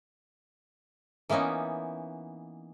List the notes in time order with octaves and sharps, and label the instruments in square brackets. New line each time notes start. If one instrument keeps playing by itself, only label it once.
[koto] E3 A#3 B3 C#4 D#4